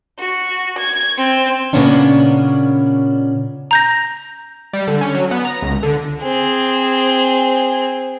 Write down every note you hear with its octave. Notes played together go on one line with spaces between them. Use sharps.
F#4
G#6
C4
A#2 C#3 A#3 B3 C#4 D4
A#5 G6 A#6
G3
D3
C#4
F#3
B3
A#5
C#2
D3
C4 G#4